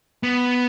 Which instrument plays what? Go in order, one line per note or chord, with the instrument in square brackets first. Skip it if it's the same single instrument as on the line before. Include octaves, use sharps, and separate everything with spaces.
[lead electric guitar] B3